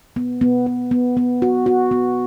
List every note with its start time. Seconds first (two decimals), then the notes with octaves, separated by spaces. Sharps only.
0.16 B3
0.41 B3
0.66 B3
0.91 B3
1.17 B3
1.42 F#4
1.66 F#4
1.91 B3